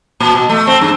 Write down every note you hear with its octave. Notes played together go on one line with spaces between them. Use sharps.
A#2
B2
A3
C4
G2